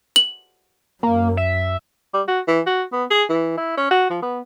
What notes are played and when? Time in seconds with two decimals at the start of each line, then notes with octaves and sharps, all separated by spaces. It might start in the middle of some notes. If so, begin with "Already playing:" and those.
0.16 F#7
1.03 F#2 A#3
1.37 E5
2.14 G3
2.28 F#4
2.48 E3
2.67 F#4
2.93 B3
3.10 G#4
3.29 E3
3.57 E4
3.77 C#4
3.91 F#4
4.10 F3
4.22 B3